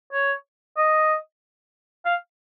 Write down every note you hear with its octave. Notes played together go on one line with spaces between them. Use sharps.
C#5
D#5
F5